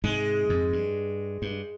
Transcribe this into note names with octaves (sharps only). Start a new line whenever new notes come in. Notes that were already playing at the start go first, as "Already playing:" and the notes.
G#2 C3 G#3
F2 G#2
G2
G2